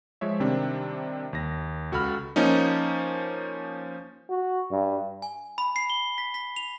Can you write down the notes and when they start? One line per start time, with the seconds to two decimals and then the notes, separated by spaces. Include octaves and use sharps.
0.21 F3 G#3 C#5 E5
0.40 C3 D#3 G3 C4 D4
1.33 D#2 A#6
1.92 C#2 F#4 A4 B5 F6
2.36 F3 A#3 C#4 D#4
4.30 F#4
4.71 G2
5.22 G#5
5.58 B5
5.76 C7
5.90 G7
6.18 B6
6.34 B6
6.56 F7